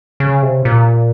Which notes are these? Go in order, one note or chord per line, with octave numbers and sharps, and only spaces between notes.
C#3
C3
A#2